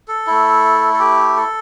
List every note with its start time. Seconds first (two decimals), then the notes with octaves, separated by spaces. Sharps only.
0.08 A4
0.27 A3 E4
0.94 A4
0.99 G4
1.36 A4